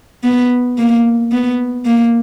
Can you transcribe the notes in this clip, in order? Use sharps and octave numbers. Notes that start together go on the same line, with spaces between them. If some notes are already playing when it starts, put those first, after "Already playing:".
B3
A#3
B3
A#3